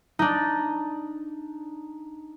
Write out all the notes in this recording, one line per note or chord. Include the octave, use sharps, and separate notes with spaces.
D4 D#4